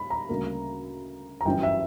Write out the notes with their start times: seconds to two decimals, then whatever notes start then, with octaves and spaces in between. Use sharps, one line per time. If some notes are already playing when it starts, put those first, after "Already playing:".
Already playing: B5
0.10 A#5
0.29 D2 C#3 G3 A#3
1.41 A#5
1.45 G1 F#2 E3 G3 G5
1.63 E5